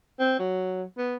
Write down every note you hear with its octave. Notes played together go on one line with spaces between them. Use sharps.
C4
F#3
B3